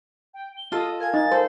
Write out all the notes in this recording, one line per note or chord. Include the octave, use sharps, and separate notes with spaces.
G5
G7
F4 A4 D#5
A#4 F5 G#5 G#6
D#4 A6
A4 C5